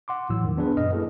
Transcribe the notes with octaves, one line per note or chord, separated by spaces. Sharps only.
F#5 C6 D6
A#1 A2 E3 F#3 E6
E2 B2 D#3 F3
B3 D4 G#4 B4
F#2 A#2 D#5 F6
A3 A#3 E4 G#4 A4 B4